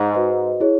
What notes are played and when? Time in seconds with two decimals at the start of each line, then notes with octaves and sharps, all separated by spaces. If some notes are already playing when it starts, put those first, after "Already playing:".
Already playing: G#2
0.15 F#4 B4 D#5
0.60 E4 G#4 C#5